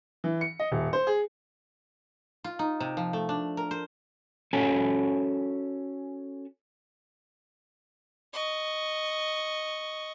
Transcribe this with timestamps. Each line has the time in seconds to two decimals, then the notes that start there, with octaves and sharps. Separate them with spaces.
0.24 E3
0.41 C#7
0.60 D#5
0.72 D#1
0.93 C5
1.07 G#4
2.44 F4
2.59 D#4
2.80 C3
2.97 F3
3.13 A3
3.29 D4
3.57 A#4
3.71 C5
4.53 C#4 F#4 A4 C#5 G#5 A5
8.33 D#5 C#6